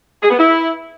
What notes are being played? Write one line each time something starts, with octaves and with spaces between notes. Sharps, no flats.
G#4
B3
E4